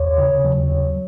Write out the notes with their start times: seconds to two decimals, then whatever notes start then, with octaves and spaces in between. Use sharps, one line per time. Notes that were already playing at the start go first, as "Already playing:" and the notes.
Already playing: D#2 C#5
0.18 C#3
0.45 F#3
0.71 D#2